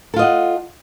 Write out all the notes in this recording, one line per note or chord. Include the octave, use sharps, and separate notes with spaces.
F4 A4 D#5 F#5